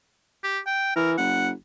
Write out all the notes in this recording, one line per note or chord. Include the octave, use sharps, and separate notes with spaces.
G4
G5
E3 A#4
F#1 F#5